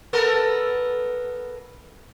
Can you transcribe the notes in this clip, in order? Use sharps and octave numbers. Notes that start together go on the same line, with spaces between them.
B3 A4 A#4